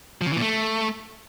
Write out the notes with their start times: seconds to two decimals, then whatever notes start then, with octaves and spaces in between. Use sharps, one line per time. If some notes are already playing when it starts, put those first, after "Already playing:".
0.21 F3
0.26 C#3
0.31 E3
0.36 A#2
0.42 A3